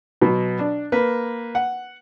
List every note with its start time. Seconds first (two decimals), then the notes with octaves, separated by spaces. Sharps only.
0.21 B2 F#3
0.59 D4
0.92 A#3 B4
1.55 F#5